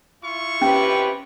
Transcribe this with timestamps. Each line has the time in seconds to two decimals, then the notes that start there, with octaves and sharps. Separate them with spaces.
0.23 E4 F4 C#6
0.62 F#2 C3 C#4 G4 B4